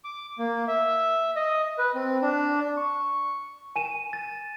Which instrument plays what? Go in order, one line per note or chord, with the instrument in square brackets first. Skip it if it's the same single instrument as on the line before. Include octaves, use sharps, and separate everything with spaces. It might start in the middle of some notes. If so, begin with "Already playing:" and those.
[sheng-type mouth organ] D6
A#3
E5
D#5
B4
C4
D4
[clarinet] C#6
[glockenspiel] G#5 D#7 E7
A6